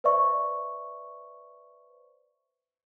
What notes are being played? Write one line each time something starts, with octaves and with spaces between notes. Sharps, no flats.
B4 C5 D5 E5 C#6